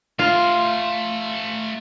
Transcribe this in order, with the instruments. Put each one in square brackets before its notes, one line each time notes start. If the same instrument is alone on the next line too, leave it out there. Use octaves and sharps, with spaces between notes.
[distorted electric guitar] A3 A#5 [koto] F4